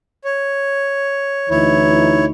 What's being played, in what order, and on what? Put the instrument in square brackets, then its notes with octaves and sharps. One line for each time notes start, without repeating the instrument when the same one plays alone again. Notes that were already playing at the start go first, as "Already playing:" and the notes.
[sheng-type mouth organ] C#5
[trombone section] D2 E3 D#4 [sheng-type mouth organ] E4 C#5